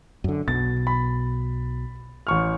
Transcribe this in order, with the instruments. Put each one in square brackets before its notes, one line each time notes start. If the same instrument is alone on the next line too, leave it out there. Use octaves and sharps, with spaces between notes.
[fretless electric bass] F#2 D3
[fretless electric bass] B1 B2 [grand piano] A6
[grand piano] B5
A1 C#6 F6